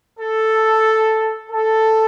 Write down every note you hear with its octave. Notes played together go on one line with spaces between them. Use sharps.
A4
A4